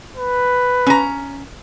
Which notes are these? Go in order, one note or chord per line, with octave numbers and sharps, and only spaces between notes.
B4
C#4 A#5